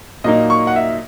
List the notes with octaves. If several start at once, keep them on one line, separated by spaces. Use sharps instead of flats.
A#2 F#3 A#3 D#4 D#5
C#6
F#5
E5